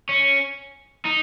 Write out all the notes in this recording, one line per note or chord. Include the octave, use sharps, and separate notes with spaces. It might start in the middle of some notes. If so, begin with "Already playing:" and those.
C#4
D#4